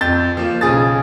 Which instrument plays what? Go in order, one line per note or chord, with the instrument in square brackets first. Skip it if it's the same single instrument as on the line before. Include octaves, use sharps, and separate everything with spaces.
[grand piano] F2 G6 A6
F3 A#3
B1 C#3 G#4 D#6 A6